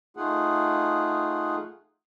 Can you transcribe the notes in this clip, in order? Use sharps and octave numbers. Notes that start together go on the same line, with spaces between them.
A3 D#4 F4 G#4 F#5